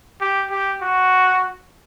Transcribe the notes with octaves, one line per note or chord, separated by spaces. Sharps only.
G4
G4
F#4